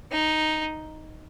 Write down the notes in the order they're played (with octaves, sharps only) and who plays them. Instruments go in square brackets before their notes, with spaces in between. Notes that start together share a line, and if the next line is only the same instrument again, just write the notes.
[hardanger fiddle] D#4